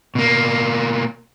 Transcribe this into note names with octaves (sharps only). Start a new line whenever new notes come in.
B2 A#3